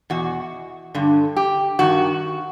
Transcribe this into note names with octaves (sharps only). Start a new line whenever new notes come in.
E2 B2 F#4
G2 D3
G4
G2 D#3 F#4